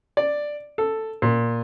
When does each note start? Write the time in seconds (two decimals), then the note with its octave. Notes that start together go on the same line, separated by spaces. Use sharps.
0.17 D5
0.78 A4
1.22 A#2